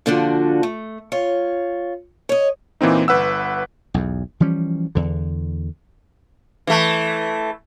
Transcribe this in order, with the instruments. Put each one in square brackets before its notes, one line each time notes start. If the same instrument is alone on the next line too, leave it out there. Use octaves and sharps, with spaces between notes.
[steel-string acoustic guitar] A#2 D3 F3 D4 F#4
A3
F4 C#5
C#5 D#5
[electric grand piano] A#2 E3 A#3 C4 D#4
G1 B4 F#5 E6
[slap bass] B1 E2
E3 F3 G3 C#4
E2 D3
[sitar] E3 A3